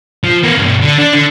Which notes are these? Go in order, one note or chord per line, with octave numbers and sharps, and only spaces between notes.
F3
B3 A#4
G2 B2
D3
D4
D3